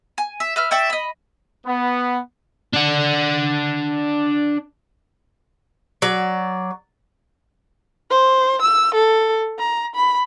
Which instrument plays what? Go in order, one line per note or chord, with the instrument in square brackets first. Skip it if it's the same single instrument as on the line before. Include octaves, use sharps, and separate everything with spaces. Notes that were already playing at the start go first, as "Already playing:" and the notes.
[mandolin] G#5
E5
B4 E5 F6
D5 E5 G5 C#6
D#5 B5
[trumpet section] B3
[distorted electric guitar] D4 F#5
[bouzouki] F#3 D5
[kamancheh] C5
E6
A4
A#5
B5